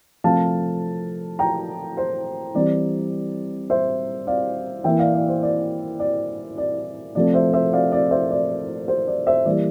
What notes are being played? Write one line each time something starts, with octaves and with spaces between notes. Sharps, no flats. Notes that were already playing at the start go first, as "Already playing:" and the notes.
C3 F3 A3 F5 A5
G5 A#5
C5
E3 G3 C4 D5
C5 E5
D5 F5
E3 A#3 E5 G5
D5 F5
D5
C5
D5
D5
D5
C3 F3 A3 C4 D5
C5 E5
C5 E5
D5 F5
D5
C5 E5
D5
C5
D5
C5 E5
E3 G3 A#3 D5